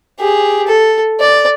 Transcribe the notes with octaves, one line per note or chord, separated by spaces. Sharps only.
G4 G#4
A4
D5